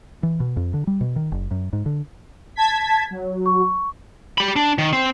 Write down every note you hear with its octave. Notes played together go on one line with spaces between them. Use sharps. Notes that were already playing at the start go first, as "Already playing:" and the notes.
E3
B2
F2
D3
G3
B2
D#3
F#1
F#2
G#2
D3
A5 G#6 B6
F#3
C#6
G4 B5
D4
D#3
C4